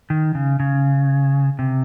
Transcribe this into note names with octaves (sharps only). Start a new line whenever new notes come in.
D#3
C#3
C#3
C3